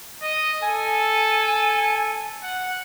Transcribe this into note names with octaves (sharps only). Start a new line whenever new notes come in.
D#5
A4 G#5
F#5